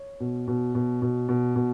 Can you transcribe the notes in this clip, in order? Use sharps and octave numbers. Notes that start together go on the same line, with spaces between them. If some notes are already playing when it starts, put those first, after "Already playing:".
Already playing: C#5
B2
B2
B2
B2
B2
B2